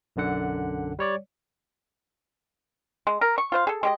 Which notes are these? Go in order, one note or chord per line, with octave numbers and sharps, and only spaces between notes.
B1 F#2 D3 F#5
G3 C#5 D5
G#3
A#4
C#6
F4 C5 F5
G#4 A4
G#3 G4 D#5